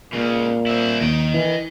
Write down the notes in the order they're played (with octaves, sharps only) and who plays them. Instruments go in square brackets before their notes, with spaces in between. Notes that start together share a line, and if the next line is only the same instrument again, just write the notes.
[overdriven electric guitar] C#2 C#3 [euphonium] A#2
[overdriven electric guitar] E4 C5
[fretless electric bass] D#2 [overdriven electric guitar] D#5 G5
[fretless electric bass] E3